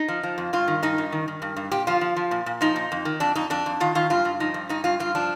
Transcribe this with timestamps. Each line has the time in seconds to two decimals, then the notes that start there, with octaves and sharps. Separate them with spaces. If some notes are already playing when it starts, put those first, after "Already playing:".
Already playing: D#4
0.08 F3
0.23 F3
0.38 F2
0.53 G2 F4
0.68 D#3
0.83 G2 D#4
0.98 G2
1.12 D#3
1.28 D#3
1.42 G2
1.56 G2
1.72 A#2 G4
1.87 F3 F4
2.01 F3
2.16 F3
2.31 A#2
2.46 A#2
2.61 F3 D#4
2.76 A#2
2.92 F2
3.05 D#3
3.20 F2 D4
3.35 F2 D#4
3.50 F2 D4
3.66 F2
3.80 D#3 F4
3.95 D#3 F4
4.10 G2 F4
4.25 G2
4.40 F3 D#4
4.54 G2
4.69 G2 D#4
4.84 G2 F4
5.00 G2 F4
5.15 F3 D4